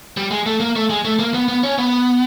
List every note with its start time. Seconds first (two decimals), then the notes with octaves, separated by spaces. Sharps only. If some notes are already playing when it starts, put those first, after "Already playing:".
0.17 G3
0.31 G#3
0.46 A3
0.60 A#3
0.76 A3
0.90 G#3
1.05 A3
1.19 A#3
1.34 B3
1.48 B3
1.63 C#4
1.78 B3